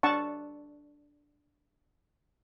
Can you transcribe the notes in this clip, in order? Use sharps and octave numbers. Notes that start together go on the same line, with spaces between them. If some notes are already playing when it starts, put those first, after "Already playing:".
D4 F#5 A5 C#6